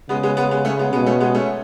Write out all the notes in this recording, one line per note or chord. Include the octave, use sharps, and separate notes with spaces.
C#3 G#3 B3
G#3 B3
G#3 B3
G#3 B3
A3 C#4
G#3 B3
B2 G#3 B3
A3 C#4
G#3 B3
A3 C#4